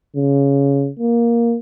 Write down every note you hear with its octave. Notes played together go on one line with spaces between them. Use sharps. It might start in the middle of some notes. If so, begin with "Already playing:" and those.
C#3
A#3